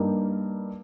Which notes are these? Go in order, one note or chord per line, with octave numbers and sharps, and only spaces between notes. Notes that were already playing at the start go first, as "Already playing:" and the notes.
Already playing: G2 G3 A#3 D#4 G4